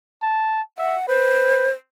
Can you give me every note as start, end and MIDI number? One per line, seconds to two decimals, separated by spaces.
0.22 0.62 81
0.78 0.97 76
0.78 1.06 78
1.08 1.70 71
1.08 1.71 72